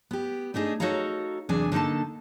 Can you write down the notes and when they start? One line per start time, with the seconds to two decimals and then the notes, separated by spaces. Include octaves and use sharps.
0.11 B3 G4
0.54 A3 D4 D#4 G#4
0.80 D#4 F#4 A4 C#5 F5 A#5
1.49 E2 C3 F#3 D4 G#4 G#5
1.72 D3 A#3 D#4 A4 A5